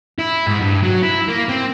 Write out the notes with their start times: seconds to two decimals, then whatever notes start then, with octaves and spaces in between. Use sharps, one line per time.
0.19 E4
0.47 G#2
0.61 G2
0.83 F#3
1.03 E4
1.28 A#3
1.48 C4